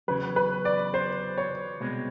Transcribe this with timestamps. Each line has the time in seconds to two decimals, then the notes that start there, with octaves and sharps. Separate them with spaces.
0.08 E2 C#3 F#3 B4
0.36 B4
0.65 D5
0.94 C5
1.38 C#5
1.80 C2 B2 G#3 C4